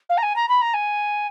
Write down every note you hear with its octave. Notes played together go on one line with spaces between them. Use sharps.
F5
A#5
G#5
A#5
B5
A#5
G#5